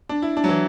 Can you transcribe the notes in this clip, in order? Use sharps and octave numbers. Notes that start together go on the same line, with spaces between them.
D4
E4
D4
F#3
E3